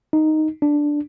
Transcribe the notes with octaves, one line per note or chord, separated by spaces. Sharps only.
D#4
D4